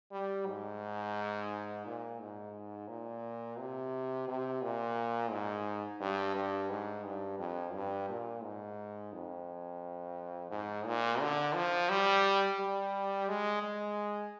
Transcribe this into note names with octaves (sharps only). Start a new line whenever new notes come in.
G3
G#2
A#2
G#2
A#2
C3
C3
A#2
G#2
G2
G2
G#2
G2
F2
G2
A#2
G#2
F2
G#2
A#2
D3
F3
G3
G3
G#3
G#3